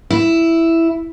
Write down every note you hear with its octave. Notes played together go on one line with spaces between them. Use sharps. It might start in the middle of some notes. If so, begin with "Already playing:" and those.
E4